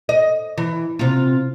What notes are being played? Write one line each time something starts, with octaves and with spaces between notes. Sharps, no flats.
D#5
E3
C3 F4